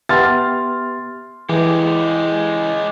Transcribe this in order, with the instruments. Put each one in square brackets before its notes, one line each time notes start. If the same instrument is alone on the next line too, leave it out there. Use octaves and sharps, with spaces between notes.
[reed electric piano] B3 G4 E5 [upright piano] C6 F6 A6
[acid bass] E3 [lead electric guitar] G#3 G4 [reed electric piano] G#4